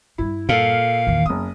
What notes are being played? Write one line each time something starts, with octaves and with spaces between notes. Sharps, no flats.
G2 G3 E4
A#2 A4 F5 F6 D7
E2 D#3
F#1 B3 D#6